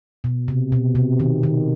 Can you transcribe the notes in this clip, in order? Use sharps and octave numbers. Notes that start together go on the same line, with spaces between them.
B2
C3
B2
C3
D#3
D#3